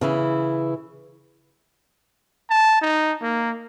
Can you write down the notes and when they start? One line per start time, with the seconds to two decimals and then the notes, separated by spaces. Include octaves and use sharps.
0.01 C#3 E3 E4
2.50 A5
2.81 D#4
3.22 A#3